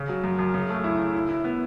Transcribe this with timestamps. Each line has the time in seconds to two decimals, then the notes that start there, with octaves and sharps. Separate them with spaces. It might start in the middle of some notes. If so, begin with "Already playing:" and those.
Already playing: C#3
0.09 F#3
0.24 F#2
0.39 F#2
0.54 C#3
0.69 A3
0.84 E4
0.99 C#3
1.14 E4
1.29 E4
1.44 B3